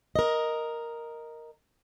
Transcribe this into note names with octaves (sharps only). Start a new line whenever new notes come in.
A#4 D#5